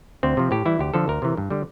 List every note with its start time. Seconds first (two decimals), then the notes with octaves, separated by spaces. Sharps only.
0.23 D2 C4
0.37 C3 F3
0.51 A2 G4
0.65 E3 G3 E4
0.79 D2 G4
0.94 D3 F3 A4
1.08 D2 A#4
1.22 C3 E3
1.37 G2
1.50 D3 G3